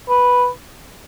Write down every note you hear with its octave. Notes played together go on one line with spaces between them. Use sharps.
B4